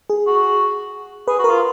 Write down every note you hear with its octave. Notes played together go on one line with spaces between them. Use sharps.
G#4
F#4
G#4 B4
F#4
A#4
F4